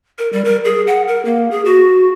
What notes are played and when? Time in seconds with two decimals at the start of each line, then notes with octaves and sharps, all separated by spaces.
0.18 A#4
0.33 G3
0.45 A#4
0.65 G#4
0.87 F#5
1.08 A#4
1.25 A#3
1.51 G#4
1.65 F#4